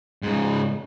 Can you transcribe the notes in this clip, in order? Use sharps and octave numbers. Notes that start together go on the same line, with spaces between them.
G#2 C#3